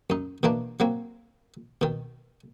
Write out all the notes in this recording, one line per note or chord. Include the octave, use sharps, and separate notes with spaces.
F#2 D#4
B2 E3 A#3 D4
F#3 A#3 C4
B2 D#3